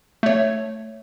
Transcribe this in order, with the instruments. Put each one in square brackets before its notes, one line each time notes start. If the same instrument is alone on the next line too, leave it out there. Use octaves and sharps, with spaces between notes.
[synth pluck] A3 C#5